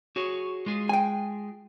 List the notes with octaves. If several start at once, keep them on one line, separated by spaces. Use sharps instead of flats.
F#4 G#4 C#5
G#3 F4 G#4
G5 G#5